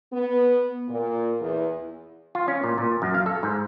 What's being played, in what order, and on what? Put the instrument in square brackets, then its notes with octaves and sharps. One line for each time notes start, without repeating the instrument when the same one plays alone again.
[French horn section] B3
A#2
E2
[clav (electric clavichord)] F4
C#4
A#2
A#2
F#2
F5
A4
G#2